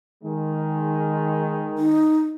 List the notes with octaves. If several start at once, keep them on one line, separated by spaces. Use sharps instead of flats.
D#3 G#3
D#4